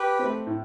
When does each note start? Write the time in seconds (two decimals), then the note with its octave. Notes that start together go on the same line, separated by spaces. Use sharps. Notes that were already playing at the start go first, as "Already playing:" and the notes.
Already playing: G4 B4
0.19 C4
0.24 A3
0.47 A2